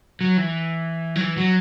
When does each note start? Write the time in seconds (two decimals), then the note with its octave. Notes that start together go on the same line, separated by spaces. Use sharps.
0.21 F#3
0.37 E3
1.16 F#3
1.21 E3
1.37 F#3